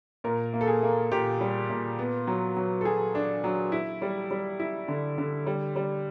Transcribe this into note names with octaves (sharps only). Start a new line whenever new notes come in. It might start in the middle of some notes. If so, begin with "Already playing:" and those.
A#2 A#4
A#3
A4
G#4
A#3
A#2 G4
G3
A#2
B3
F#3
F#3
A4
F#3 G#4
D4
F#3
E4
G3
G3
E4
D3
D3
G3
G3